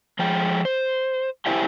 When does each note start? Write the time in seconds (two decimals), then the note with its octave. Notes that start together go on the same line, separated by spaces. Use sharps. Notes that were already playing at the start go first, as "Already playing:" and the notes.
0.19 F3 G#3 G5
0.65 C5
1.46 E4 G4 C5 E5 G5 G#5